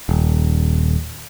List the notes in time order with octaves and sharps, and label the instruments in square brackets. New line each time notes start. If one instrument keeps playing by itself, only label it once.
[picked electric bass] D#1